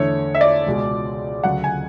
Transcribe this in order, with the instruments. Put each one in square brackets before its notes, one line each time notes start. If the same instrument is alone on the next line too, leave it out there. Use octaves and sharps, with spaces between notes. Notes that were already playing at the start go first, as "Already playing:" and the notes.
Already playing: [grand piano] E2 D3 A3 C#5
E5
D5
C#2 B2 G#3
D2 C#3 F#3 F#5
G#5